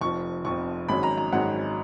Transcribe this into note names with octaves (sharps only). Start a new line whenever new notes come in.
F1 F2 F3 C#6
F1 F2 F3 C#6
G#1 G#2 F#3 C#4 B5
A#5
A#5
G#1 G#2 F#3 C#4 F#5